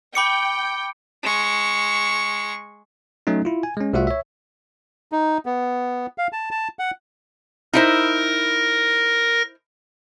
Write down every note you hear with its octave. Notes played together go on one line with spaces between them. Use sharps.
G5 B5 D6 C#7
G#3 C#6
F#3 A3 C#4 D#4
E4 F4
G#5
G#3 C#4
C2 A3 F4 F#4 E5 F#5
C#5 E5
D#4
B3
F5
A5
A5
F#5
D#4 E4 A#4 C5 A#6